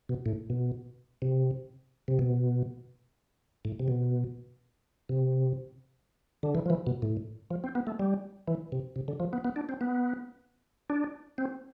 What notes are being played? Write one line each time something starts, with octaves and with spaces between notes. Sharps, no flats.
B2
A2
B2
C3
C3
B2
A2
C3
B2
C3
D3
E3
F3
E3
B2
A2
F3
C4
B3
A3
G3
E3
C3
C3
D3
F3
B3
B3
D4
C4
B3
D4
C4